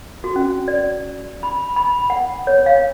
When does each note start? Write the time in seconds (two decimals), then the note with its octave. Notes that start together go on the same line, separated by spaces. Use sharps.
0.24 F#4
0.36 C#4
0.68 D5
1.43 B5
1.76 B5
2.10 F#5
2.47 C#5
2.66 F5